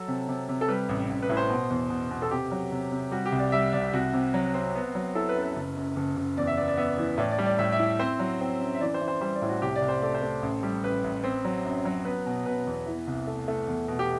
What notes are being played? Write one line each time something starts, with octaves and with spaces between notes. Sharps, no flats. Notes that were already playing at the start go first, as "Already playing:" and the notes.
Already playing: F#3 A4
C3
C3
C3
A4
G3 B4
A1
A1
B4
A2
C5
B2
E2
B2
B2
A4
C3 G4
F#3
C3
C3
G3 F#4
G4
C2
D5
G3 E5
C2 D5
C2 F#4
C3
F#3
C4
B3
F#3
E4 A4
B4
F#2
B4
F#1
F#2
F#1
F#1
E2 D5
E5
B3 D5
D5
B3 E5
E3
A2 D5
D5
G3
D5
A2 E5
E5
E4
C4 C5
F#3
C4
F#2
E5
E3 D5
C5
E3
C5
G3 C5
D5
A2
F#4
C2 G4
D5
C2
C5
A3 D5
C5
A3
A1
G3
A1 B4
A1
C4
F#3
F#2
F#3
B3 B4
B2
B2 B4
E2
E3
C2
A3
A3
E2
B2
G4